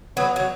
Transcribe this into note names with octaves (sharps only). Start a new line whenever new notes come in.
F#3 B3
F#3